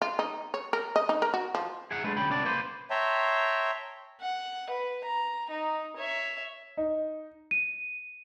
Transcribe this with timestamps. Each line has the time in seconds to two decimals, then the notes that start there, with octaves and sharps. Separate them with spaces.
0.02 F4
0.19 D#4
0.54 C#5
0.73 A#4
0.96 D#5
1.09 D#4
1.22 A#4
1.34 F#4
1.55 F3
1.91 G#4 E5 F#5
2.04 G#3 A3 D4 B4
2.16 D2 C#4 G5 B5
2.30 C2 B3 C#4 D4 D5
2.44 A#3 B4 C5
2.90 C#5 E5 G5 A5 A#5 C6
4.21 F#5
4.70 B4
5.04 A#5
5.50 D#4
5.97 C#5 E5
6.77 D#4
7.51 D#7